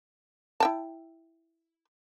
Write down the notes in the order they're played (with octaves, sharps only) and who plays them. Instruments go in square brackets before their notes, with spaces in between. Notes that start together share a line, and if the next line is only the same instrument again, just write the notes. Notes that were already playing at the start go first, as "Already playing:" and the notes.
[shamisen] E4 G5 A5